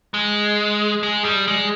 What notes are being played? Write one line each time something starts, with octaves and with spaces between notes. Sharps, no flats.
G#3
G#3
G3
G#3